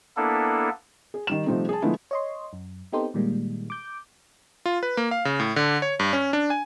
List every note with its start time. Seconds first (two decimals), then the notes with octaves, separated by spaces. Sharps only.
0.17 A#3 B3 D4 E4 A4
1.14 G#4
1.27 D#3 G3 E7
1.46 C3 F3 G3 A3 C4 D#4
1.69 G#4 A5
1.82 D3 F3 G#3 A3 B3 E4
2.11 C#5 D#5 C6
2.53 F#2
2.93 B3 C4 D#4 G4 A4 C5
3.14 A#2 D#3 G3 G#3 A#3
3.70 D6 G6
4.66 F4
4.83 B4
4.97 A#3
5.11 F5
5.25 C#3
5.40 A2
5.56 D3
5.82 C#5
5.99 G2
6.13 C#4
6.33 D4
6.50 G#5